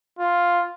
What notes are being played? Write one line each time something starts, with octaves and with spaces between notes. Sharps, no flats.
F4